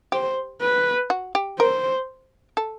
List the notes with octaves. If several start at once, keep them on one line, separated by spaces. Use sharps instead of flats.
G4 C5
B4
F#4
G4
A#4 C5
A4